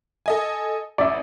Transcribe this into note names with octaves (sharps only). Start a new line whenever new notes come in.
A4 D#5 G#5
A1 D5 E5